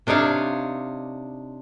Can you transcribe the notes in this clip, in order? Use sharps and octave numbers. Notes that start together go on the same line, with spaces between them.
C3 D4 D#4 C#5 F5